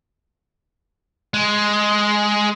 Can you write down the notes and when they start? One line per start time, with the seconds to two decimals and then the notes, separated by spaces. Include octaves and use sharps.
1.34 G#3